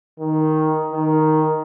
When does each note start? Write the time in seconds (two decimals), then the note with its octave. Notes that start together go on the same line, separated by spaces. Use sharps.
0.19 D#3
0.92 D#3